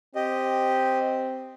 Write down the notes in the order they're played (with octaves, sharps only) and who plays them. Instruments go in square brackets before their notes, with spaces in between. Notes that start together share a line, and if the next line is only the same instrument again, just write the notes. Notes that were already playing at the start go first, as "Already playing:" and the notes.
[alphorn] C4 [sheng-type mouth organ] G4 D#5